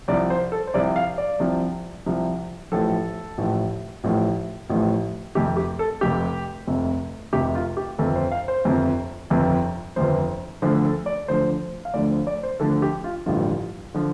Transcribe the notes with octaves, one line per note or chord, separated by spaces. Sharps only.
C2 C3 F3 D5
C5
A4
C5
C2 C3 F3 D5
F5
D5
C2 C3 F3
C2 C3 F3
A1 A2 F3 A4
A1 A2 F3
A1 A2 F3
A1 A2 F3
F1 F2 C3 G4
G4
A4
F1 F2 C3 G4
F1 F2 C3
F1 F2 C3 G4
F4
G4
G1 F2 C3 F3 A4
C5
F5
C5
G1 F2 C3 F3
G1 F2 C3 F3
G1 F2 C3 F3 C5
D2 D3 F3 C5
A4
D5
D2 D3 F3 C5
F5
D2 D3 F3 D5
C5
D5
C5
D2 D3 F3 A4
G4
F4
A1 G2 D3 F3 F4
D3 F3